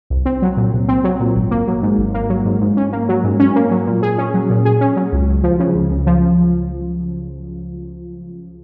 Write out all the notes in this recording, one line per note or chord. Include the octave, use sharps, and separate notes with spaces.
C2
C4
F#3
A#2
C2
C4
F#3
A#2
G#1
A#3
F#3
G#2
G#1
A#3
F#3
G#2
G#2
C#4
A#3
F#3
G#2
C#4
A#3
F#3
A#2
G#4
C#4
F#3
A#2
G#4
C#4
F#3
C#2
C#2
F3
C#3
C#2
C#2
F3